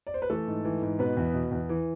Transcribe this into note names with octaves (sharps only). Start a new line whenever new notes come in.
D5
C5
B4
E3 A3 A4
G#2
E3
G#2
B2 B3 B4
E2
B2
E2
E3